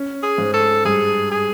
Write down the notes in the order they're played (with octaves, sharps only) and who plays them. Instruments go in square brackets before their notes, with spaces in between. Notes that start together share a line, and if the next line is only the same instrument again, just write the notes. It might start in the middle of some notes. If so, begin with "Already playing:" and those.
Already playing: [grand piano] C#4
[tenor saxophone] G#4
[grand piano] G#2
[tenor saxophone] A4
[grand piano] G2 [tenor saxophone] G#4
[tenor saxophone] G#4